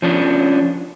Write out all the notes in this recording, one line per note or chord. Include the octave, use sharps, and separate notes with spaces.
F3 C#4 D4